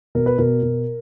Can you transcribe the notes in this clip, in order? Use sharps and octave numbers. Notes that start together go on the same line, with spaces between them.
B2 A#4
B4
B2 A#4
B2